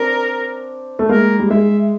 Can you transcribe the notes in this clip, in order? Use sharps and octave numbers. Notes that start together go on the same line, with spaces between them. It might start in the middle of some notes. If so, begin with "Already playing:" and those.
Already playing: C4 D4 A#4
A3
G#3 A#3 A#4
G3
G#3 E5